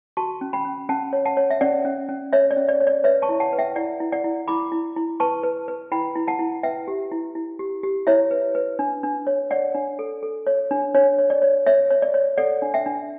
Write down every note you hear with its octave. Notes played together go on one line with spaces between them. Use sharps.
F#4 A5 C#6
C#4
G5 B5
C#4
C#4 F#5 A5
C#5
F#5 A5
C#5
E5
C#4 D5 F#5
C#4
C#4
C#5 E5
D5
C#4
D5
C#5
D5
B4 C#5 E5
A5 C#6
E4
F#5 A5
B4
E5 G5
E4 D5 F#5
E4
D5 F#5
E4
E4 B5 D6
E4
E4
B4 A5 C#6
B4
B4
E4 G5 B5
E4
F#5 A5
E4
B4 E5 G5
G4
E4
E4
G4
G4
E4 C#5 E5
B4
B4
D4
D4
C#5
C#5 D5 F#5
D4
A4
A4
C#5
D4
D4 C#5
C#5
D5
C#5
C#5 E5
C#5
D5
C#5
A4 D5 F#5
D4
E5 G5
D4